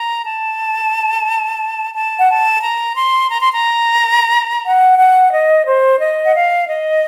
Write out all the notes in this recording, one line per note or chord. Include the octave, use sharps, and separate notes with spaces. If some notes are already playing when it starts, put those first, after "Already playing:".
Already playing: A#5
A5
A5
F#5
A5
A#5
C6
A#5
C6
A#5
F#5
F#5
D#5
C5
D#5
F#5
F5
D#5